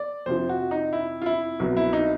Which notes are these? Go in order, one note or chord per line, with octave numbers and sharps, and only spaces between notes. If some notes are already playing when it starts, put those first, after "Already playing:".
Already playing: D5
F2 C3 F3 C5
F#4
D#4
E4
F4
E4
C2 B2 F#3
E4
D#4